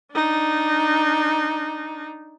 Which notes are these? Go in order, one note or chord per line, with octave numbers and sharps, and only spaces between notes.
D4 D#4